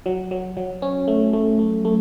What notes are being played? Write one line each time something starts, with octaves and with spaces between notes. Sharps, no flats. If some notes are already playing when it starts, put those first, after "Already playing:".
F#3
F#3
F#3
C#4
A3
A3
A3
A3